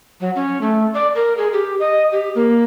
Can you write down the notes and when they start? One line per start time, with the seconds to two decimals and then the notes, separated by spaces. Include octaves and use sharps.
0.21 F#3
0.35 C#4
0.61 A3
0.94 D5
1.15 A#4
1.37 G#4
1.53 G4
1.80 D#5
2.12 G4
2.35 A#3